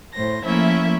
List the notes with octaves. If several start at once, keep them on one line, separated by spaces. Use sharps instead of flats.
A2 C5 A#6
F3 A3 A#3 C#4 E4 E5